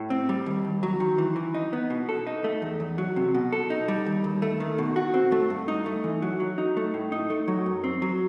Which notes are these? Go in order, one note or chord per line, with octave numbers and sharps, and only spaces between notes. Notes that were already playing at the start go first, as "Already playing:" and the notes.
Already playing: A2
C4
G3
D#2
D#2
F#3
D#3
E3
E3
D#4
B3
B2
A4
D#4
A3
E2
E2
F#3
C3
B2
A4
D#4
G3
D#2
D#2
A3
D#3
B2
F#4
C4
A3
G2
D#4
A3
E3
F#3
F#3
D#4
A3
A2
D#4
A3
F#3
F#2
C4
F#3